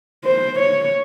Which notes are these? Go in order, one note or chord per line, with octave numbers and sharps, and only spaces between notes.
C5
C#5